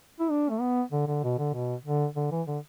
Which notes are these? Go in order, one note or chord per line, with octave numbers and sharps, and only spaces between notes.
E4
D4
A3
B3
D3
D3
B2
D3
B2
D3
D3
E3
D3